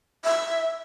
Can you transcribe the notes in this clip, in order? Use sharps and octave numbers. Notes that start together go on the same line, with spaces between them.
E5